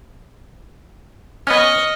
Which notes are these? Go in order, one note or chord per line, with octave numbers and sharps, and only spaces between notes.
B3 C#4 D#5 C#6 F6